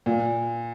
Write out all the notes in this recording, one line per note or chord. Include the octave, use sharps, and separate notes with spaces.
A#2